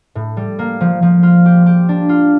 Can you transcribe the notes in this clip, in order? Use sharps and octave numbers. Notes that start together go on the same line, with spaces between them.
A2
G3
A#3
F3
F3
F4
G4
G4
D4
F4